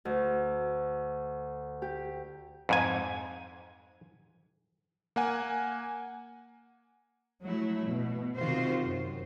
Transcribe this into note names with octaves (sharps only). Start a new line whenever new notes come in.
D2
G4
F2 G#2 G#5
A#3 F#5 G#5
F#3 A3 E4
B2
C3 D#3 F4 F#4 C5
F#2